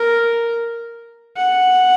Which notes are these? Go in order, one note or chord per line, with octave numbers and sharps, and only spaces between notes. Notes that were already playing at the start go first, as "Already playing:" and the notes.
Already playing: A#4
F#5